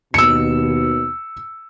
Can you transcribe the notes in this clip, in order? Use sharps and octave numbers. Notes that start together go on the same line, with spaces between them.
D#2 B2 E6 C#7